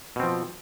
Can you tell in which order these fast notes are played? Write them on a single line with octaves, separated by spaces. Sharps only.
B2 C4 F3